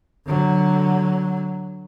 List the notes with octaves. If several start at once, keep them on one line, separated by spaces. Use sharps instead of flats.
D3 F#3